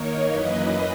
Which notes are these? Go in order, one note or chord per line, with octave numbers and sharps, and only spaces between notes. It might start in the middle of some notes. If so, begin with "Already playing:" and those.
Already playing: D#3 A#3 D#4 A#4 C#5
F#2 E3 A#3 B4 D#5